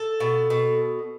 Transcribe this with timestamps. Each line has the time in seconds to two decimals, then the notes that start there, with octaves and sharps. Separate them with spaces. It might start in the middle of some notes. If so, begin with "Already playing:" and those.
Already playing: A4
0.20 B2
0.50 B2